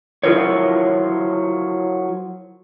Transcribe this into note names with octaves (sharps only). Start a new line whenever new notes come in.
F#3 E4 F4 A#4 C5 C#5